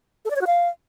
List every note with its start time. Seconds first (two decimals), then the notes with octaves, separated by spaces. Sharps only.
0.25 A4
0.30 D5
0.36 C#5
0.41 F#4
0.47 F5